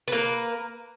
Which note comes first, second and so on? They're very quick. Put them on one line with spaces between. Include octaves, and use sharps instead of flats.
B4 A#3 A#4